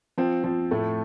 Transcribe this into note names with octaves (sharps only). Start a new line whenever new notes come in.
F3 C4
F3 C4
A2 A3